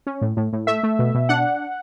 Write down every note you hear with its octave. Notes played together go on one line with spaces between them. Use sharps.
C#4
A2
A2
A2
A3 E5
A3
B2
B2
D4 F#5